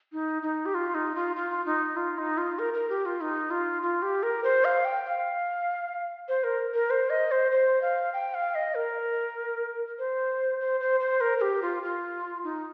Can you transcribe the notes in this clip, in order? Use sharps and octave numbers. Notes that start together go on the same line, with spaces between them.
D#4
D#4
G4
F4
D#4
F4
F4
D#4
F4
D#4
F4
A#4
A#4
G4
F4
D#4
F4
F4
G4
A#4
C5
F5
G5
F5
C5
A#4
A#4
C5
D#5
C5
C5
F5
G5
F5
D#5
A#4
C5
C5
C5
C5
A#4
A#4
G4
F4
F4
D#4